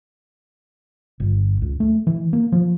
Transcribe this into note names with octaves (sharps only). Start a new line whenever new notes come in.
G1
C#2
A3
E3
A#3
F3